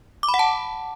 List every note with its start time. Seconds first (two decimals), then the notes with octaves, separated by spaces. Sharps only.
0.23 D6
0.28 B5
0.34 F#5
0.39 A5